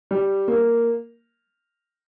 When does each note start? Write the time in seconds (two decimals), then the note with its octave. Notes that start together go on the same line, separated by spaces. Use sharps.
0.11 G3
0.48 A#3